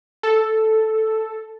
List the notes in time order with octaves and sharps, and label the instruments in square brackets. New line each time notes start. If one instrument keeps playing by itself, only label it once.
[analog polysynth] A4